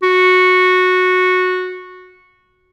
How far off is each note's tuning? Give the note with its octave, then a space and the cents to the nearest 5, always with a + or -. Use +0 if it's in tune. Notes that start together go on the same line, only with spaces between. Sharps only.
F#4 -10